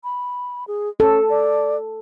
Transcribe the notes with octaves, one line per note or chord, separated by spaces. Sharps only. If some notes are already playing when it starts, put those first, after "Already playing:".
B5
G#4
C#4 A4
D5